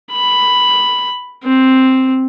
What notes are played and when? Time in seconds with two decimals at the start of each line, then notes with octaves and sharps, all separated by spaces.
0.12 B5
1.44 C4